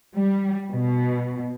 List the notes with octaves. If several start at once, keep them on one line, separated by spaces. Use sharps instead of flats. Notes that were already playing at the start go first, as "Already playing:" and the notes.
G3
B2